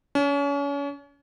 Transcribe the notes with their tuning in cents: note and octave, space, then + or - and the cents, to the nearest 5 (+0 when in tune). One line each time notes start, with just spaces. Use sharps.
C#4 +35